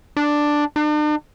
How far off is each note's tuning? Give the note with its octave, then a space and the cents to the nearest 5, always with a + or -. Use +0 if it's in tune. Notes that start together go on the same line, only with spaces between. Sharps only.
D4 +5
D4 +45